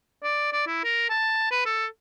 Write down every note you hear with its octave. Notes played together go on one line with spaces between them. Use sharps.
D5
D5
E4
A#4
A5
B4
A4